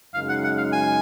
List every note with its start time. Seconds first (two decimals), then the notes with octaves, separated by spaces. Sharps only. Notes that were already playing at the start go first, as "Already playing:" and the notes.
0.14 F#2 C#3 G#3 D#4 F5
0.29 F#5
0.44 F#5
0.58 F5
0.73 G#5